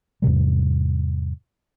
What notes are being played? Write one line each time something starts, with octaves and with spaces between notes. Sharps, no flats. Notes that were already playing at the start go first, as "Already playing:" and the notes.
E2 G#2 C3 G3